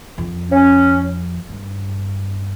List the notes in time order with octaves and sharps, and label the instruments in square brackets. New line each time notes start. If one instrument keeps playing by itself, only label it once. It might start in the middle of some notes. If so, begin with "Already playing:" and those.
[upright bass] F2
[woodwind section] C#4
[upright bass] G2